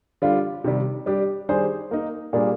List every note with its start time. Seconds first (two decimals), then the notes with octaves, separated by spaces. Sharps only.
0.22 D3 G3 D4 F4
0.64 C3 D#3 G3
1.06 G3 D4 G4
1.49 D#3 G3 D4 G#4 C5
1.91 A#3 D#4 A#4
2.33 A#2 G3 A#3 D4 G#4